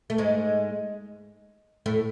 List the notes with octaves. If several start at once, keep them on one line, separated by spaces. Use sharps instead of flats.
A3
G#2 G#3
A2 A3